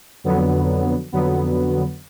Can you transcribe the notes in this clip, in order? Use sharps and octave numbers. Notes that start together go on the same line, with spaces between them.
F2 D3 F#3 B3
F2 D3 F#3 B3